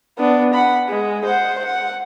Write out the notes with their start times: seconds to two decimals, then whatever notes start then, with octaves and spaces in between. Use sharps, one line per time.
0.19 B3 D4
0.53 F#5 B5
0.88 G#3
1.25 C5 F#5
1.64 F#5